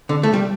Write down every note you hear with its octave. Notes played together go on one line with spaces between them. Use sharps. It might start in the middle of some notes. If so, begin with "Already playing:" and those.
D3
A3
G3